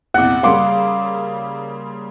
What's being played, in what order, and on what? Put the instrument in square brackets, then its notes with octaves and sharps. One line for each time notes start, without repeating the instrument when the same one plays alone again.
[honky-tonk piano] A#1 E2 C3 [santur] F#5 D6
[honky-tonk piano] C#3 G3 A#3 [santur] F5 C6 D6